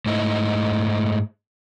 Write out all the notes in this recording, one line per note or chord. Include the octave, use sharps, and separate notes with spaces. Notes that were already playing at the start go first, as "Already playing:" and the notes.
G#2 A3 D#4 E4